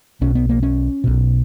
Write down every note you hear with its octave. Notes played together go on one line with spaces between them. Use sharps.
B1 B2 C#4
B3
A#3
C#4
B1 B2